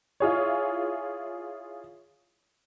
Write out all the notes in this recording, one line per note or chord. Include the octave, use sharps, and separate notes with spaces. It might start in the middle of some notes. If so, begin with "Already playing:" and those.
E4 F4 G#4 C#5